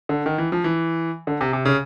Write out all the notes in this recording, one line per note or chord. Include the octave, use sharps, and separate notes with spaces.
D3
D#3
E3
F3
E3
D3
C3
C3
C#3